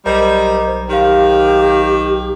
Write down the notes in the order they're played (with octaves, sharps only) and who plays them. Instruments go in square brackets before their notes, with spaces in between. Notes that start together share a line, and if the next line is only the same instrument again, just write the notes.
[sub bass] B1 [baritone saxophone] G3 [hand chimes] A#4 D#5 A#5 [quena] C5
[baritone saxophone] D#3 [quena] G4 [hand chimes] C5 F5